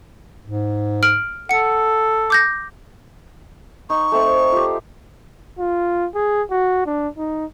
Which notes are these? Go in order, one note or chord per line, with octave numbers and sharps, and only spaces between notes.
G#2
F6 D7 F#7
A4 F#5 C#7
D6 G6 A#6
D#4 C#6
A3 C4
F4 G4
F4
G#4
F#4
D4
D#4